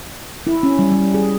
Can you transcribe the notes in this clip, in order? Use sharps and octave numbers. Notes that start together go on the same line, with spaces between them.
E4
C#4
G3
G3
G#4